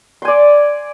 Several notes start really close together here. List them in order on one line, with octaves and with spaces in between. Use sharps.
C6 G#5 D5